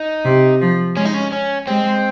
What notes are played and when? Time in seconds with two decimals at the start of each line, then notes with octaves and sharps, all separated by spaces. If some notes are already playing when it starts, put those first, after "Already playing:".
Already playing: D#4
0.25 C3
0.61 F3
0.97 G#3 C#4
1.05 D#4
1.14 C#4
1.32 C#4
1.67 G#3 C4